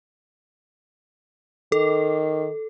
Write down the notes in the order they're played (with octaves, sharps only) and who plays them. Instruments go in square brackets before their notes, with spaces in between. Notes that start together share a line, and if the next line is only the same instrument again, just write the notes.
[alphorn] D#3 [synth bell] A4